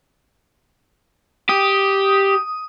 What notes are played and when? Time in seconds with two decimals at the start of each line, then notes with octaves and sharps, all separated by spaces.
1.49 G4 D#6